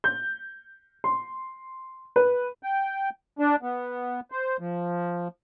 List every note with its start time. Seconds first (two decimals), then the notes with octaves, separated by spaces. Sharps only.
0.04 G6
1.04 C6
2.16 B4
2.63 G5
3.39 D4
3.62 B3
4.31 C5
4.60 F3